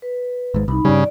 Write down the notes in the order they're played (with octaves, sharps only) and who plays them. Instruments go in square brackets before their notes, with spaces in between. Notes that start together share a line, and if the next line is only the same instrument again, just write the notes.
[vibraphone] B4
[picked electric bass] G#1 G#2
[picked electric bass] C2 [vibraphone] D#4 B5
[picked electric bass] G2 G3 [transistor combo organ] C#3 [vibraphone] D5